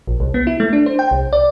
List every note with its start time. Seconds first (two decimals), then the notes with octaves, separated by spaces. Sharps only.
0.07 A#1
0.20 C2
0.34 B3
0.47 E4
0.60 A3
0.73 D4
0.86 C5
0.99 G5
1.11 C2
1.33 D5